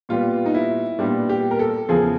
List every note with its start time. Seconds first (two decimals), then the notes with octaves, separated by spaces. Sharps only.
0.09 A#2 G3 B3 F4
0.46 D#4
0.54 E4
0.99 A#2 G3 B3 D4
1.29 G4
1.51 A#4
1.59 A4
1.89 E2 C#3 F3 G#4